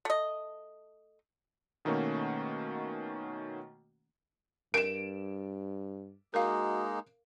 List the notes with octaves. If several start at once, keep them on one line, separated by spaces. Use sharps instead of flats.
A3 D#5
B2 D#3 A3 A#3 C#4 F#4
G2 A#4 D7 E7
G#3 A#3 D#4 F#4 A#4 F5